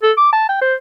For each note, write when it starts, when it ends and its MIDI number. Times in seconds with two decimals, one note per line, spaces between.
0.03 0.12 69
0.17 0.30 86
0.33 0.48 81
0.49 0.58 79
0.61 0.75 72